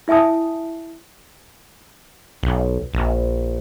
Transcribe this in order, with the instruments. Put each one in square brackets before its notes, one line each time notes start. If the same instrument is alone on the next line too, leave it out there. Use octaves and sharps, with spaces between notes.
[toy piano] E4 E5 G#5 A5 D#6
[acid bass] B1
A#1